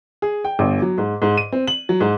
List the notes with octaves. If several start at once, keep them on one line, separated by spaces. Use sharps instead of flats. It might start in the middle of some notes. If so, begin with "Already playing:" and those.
G#4
G5
G1
F#3
G#2
G#2
D#7
C4
F#7
F#3
G#2